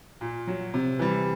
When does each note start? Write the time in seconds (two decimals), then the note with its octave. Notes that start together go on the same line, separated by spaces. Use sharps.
0.21 A#2
0.47 F#3
0.74 C3
0.99 E3 G3